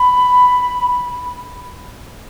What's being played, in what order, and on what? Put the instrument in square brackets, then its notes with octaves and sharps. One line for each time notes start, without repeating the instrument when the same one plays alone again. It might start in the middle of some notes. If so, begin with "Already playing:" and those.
Already playing: [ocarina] B5